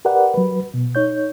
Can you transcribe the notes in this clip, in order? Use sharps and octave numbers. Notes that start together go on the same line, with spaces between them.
G4 A#4 B4 D5 F#5
F#3 B4
B2
D#4 C#5 G6